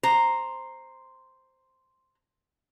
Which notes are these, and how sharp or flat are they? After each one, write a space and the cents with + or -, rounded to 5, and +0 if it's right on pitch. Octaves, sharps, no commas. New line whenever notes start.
C5 +0 A#5 +0